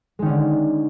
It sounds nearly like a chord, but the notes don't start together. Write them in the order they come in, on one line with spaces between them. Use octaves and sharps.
G#3 D#3 C#4 D3